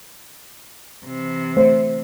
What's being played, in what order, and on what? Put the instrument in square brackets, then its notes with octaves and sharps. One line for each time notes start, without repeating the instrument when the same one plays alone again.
[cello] C3 E3
[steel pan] A3 [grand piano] C5